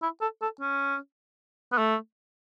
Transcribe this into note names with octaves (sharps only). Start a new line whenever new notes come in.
E4
A4
A4
C#4
B3
A3